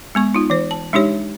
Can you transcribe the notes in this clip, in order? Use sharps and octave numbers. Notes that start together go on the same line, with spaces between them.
G#3 B3 C#6
D#4 F4
E3 C5
A5
G#3 D4 D#4 G4 C#5